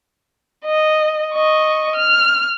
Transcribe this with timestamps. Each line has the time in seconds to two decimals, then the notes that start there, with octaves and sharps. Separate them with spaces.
0.66 D#5
1.33 D#5 C#6
1.96 F6